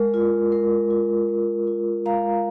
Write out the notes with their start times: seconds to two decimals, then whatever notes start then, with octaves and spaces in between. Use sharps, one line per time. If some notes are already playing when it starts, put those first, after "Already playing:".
Already playing: G#3 A#4
0.14 F4
0.52 G#3 A#4
0.90 F4
1.29 G#3
1.67 F4
2.06 G#3 F5 A#5